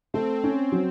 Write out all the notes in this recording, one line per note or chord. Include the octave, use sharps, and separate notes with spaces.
A3 C4
C#4
F#3